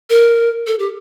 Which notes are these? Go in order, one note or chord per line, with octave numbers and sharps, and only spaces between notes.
A#4
A4
G4